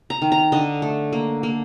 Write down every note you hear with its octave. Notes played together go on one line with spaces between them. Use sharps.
A#5
D#3
A#5
D3 D#5
A3
A#3
A#3